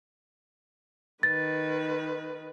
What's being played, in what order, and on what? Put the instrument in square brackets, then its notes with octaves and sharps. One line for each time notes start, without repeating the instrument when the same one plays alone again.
[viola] D#3 B4 [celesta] A6